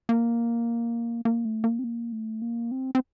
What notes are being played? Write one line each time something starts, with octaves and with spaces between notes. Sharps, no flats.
A#3
A#3
A3
A#3
C4
A#3
A3
A#3
C4
C4